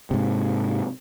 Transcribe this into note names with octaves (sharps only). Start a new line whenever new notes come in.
G#2 C3